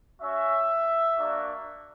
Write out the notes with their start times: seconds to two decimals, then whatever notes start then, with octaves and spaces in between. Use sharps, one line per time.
0.20 C#4 F#4 E5
1.17 A#3 D4 F#4